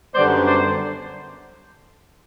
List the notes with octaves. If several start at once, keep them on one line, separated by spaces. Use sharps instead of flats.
F#2 D3 G3 B3 C5 D5
C5 D5